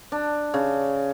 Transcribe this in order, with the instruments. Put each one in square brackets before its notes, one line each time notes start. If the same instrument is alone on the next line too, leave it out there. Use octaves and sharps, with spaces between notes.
[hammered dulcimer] D4
C#3